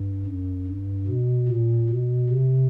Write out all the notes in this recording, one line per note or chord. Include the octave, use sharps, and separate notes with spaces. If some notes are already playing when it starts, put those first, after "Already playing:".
Already playing: G2
F#2
G2
B2
A#2
B2
C3